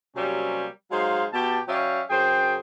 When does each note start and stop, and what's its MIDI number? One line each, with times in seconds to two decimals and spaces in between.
0.15 0.66 48
0.15 0.66 54
0.15 0.66 55
0.15 0.66 58
0.15 0.66 60
0.15 0.66 61
0.92 1.25 54
0.92 1.25 56
0.92 1.25 63
0.92 1.25 72
0.92 1.25 77
1.33 1.59 47
1.33 1.59 67
1.33 1.59 81
1.68 2.01 54
1.68 2.01 61
1.68 2.01 74
1.68 2.01 76
1.68 2.01 77
1.68 2.01 79
2.10 2.57 42
2.10 2.57 49
2.10 2.57 68
2.10 2.57 72
2.10 2.57 79